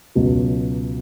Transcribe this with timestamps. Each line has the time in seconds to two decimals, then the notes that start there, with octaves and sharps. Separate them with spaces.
0.15 C#2 B2 F#3